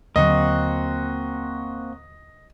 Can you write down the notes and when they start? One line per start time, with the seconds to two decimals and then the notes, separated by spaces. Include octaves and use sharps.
0.16 D#2 D3 F#3 A#3 C4 F#4 D#5